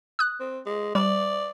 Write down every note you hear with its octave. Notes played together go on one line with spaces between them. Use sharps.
D#6 F#6
C4
G#3
G3 D5